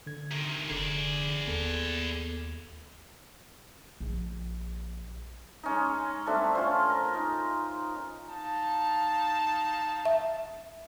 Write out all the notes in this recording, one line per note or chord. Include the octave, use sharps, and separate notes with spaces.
D3 G#6
C3 D#3 A#5
F1 D3 G#4 D5
D#2 B3 A4
A#1
G#3 C#4 D#4
G3 A3 C4 D4
C#4 F4 C5
A#4
D#4
D#4 F5 A5
E5